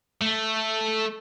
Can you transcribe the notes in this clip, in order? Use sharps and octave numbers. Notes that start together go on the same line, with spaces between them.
A3